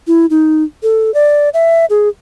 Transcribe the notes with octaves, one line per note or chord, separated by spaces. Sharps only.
E4
D#4
A4
D5
E5
G#4